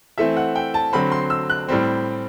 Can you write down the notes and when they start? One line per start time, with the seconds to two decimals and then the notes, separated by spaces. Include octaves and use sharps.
0.18 E3 A3 C4 E5
0.37 F#5
0.56 G5
0.74 A5
0.93 D3 F#3 C4 B5
1.12 C6
1.30 E6
1.50 F#6
1.68 A2 G3 C4